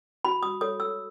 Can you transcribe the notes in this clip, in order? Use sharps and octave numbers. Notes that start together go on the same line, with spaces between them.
F#4 B5
D#6
A4 C#5 D#6
E6